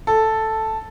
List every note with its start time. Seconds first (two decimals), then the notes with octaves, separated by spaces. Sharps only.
0.07 A4